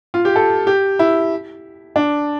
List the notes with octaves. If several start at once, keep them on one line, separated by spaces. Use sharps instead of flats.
F4
G4
A4
G4
E4
D4